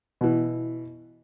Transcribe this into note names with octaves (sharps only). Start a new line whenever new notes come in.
B2 E3